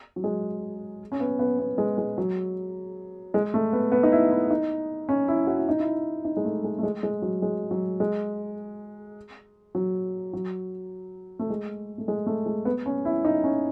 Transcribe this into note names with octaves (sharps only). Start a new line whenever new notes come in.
F#3
G#3
C#4
B3
B3
B3
G#3
G#3
F#3
G#3
A3
B3
B3
D#4
E4
E4
D#4
C#4
E4
F#4
E4
D#4
E4
D#4
G#3
A3
G#3
A3
G#3
G#3
F#3
G#3
F#3
G#3
F#3
F#3
A3
G#3
A3
G#3
A3
G#3
B3
C#4
E4
D#4
C#4